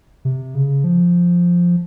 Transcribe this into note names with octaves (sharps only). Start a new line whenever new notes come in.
C3
C#3
F3